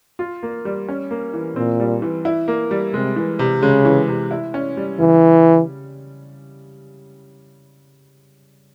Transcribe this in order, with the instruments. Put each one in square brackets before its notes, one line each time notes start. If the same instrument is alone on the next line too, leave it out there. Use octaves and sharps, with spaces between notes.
[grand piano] F4
A#3
G3
C#4
A#3
E3
[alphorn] A#2 [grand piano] C4
[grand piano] G3
E3
E4
A#3
G3
[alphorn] C3 [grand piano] G#3
[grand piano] E3
C3
[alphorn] C#3 [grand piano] G#3
[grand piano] E3
C3
E4
C#4
G3
[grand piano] C#3 [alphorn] E3